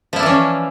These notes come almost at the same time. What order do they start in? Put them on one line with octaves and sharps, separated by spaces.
F3 E4 D4 E3 C#4